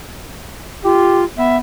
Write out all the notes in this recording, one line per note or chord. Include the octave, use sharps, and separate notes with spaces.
F4 G4
B3 E5